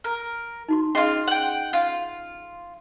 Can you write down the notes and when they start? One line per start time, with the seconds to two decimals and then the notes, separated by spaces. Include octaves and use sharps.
0.04 A#4
0.68 D#4 F#4 C6
0.95 C#4 F4 G#4 D#5 C6
1.27 F#5 G5
1.73 F4